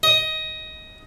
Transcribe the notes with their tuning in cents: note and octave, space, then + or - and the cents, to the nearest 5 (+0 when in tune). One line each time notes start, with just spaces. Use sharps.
D#5 +15